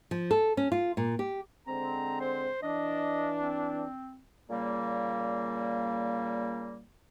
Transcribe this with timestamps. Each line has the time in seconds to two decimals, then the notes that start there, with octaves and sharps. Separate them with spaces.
0.11 F3
0.31 A4
0.57 C#4
0.72 F4
0.97 A#2
1.19 G4
1.67 D3 G#3 C4 A#5
2.21 C5
2.63 E3 D4 D#5
3.40 C4
4.50 A#2 C#3 G3 A#3